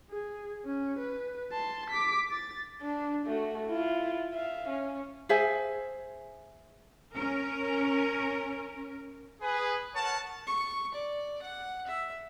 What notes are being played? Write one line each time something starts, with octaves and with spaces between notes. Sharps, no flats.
G#4
C#4
B4
A5 C6
D6 B6
A6
D4
A3 F#4
E4 F4
E5 F5
C#4
G#4 C5 E5 G#5
C#4 A#4
G#4 B4
A#4 C#5 F#5 A5
C#6
D5
F#5
E5